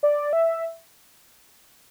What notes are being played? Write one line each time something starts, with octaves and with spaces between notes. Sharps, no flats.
D5
E5